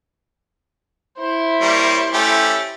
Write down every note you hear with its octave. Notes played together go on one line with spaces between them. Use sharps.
E4 C5
G3 A#3 C#5
A3 C#4 G4